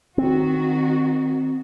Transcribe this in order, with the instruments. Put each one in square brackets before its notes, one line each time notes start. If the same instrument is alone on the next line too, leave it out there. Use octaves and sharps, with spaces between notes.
[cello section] D#3 F#4 [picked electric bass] C4